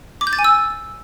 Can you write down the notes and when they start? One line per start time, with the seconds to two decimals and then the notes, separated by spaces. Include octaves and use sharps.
0.21 D6
0.27 G6
0.33 A6
0.39 G#5
0.44 E6